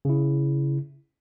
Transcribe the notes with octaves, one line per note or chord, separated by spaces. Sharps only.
C#3 E4